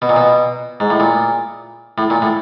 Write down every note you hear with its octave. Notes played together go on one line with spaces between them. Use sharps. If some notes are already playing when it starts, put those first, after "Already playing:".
B2
A#2
B2
G#2
A2
A#2
A2
A#2
A2